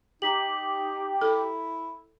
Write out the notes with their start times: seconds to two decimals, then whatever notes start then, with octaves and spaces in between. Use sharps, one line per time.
0.22 D#4 G4 A#5 B6 F#7
1.21 E4 A4